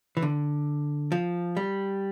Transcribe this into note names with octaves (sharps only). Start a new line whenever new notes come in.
E3
D3
F3
G3